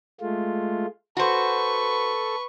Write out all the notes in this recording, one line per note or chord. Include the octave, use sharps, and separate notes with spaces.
G#3 A3 F4
F#4 A4 B4 C5 C#6